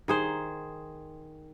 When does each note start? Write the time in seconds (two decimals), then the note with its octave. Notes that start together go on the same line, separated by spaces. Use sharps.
0.08 D#3 G#4 C5